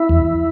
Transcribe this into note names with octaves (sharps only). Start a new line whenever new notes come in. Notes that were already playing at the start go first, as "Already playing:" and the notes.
Already playing: E4
E2